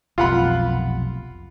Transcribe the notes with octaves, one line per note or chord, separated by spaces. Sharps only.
F1 B1 C3 F4 F#5 B5